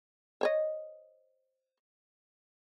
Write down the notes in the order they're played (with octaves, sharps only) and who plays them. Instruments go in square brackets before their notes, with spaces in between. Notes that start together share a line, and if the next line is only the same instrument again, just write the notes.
[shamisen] C5 C#5 D#5